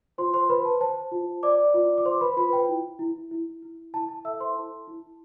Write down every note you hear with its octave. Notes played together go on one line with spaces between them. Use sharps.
F4 C5 C6
C5 C6
B4 C5 B5
A5
C5 A5
F4
C5 D5 D6
F4
D6
C5 C6
B4 B5
F4 B4 B5
G5
E4
E4
E4
E4
E4 A5
A5
A4 E5 E6
C5 C6
E4 A5
E4